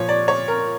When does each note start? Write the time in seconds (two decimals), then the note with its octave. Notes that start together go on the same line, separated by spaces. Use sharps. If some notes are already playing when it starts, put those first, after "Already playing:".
Already playing: A#2 F3 C#5
0.09 D5
0.28 C#5
0.48 A#4